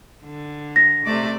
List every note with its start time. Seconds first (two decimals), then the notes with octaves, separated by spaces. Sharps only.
0.23 D3
0.76 A#6
1.06 C3 A3 D5